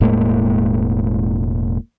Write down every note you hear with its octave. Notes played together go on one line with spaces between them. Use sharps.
E1 A2 G#3 A#3